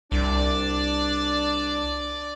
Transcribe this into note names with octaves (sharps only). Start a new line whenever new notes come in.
C2 D4 D5